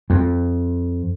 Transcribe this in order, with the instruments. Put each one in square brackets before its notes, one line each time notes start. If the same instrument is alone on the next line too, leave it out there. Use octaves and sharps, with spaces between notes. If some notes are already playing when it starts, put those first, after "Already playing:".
[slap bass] F2